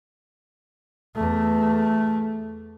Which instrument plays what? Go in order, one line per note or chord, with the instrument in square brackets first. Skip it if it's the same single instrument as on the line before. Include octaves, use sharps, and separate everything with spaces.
[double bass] E2 A3